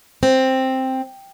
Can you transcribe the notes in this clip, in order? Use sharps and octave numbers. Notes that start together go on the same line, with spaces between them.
C4